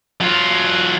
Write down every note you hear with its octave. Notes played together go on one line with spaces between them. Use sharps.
F#3 F4